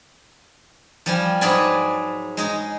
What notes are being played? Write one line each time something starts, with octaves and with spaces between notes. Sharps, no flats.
F3 G3 G#5
G#2 F#3 G#4 B4 D5 G#5
G#3 D#4 G#4